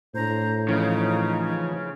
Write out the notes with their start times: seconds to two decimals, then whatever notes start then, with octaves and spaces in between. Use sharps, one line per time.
0.14 A2 D4 C5 A#5
0.69 C#3 E3 F3 D#4